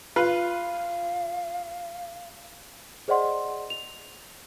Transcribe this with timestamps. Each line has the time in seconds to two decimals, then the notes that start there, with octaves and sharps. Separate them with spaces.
0.16 F4 B4 F5
3.08 G#4 C5 D5 D#5 F#5 C6
3.70 F7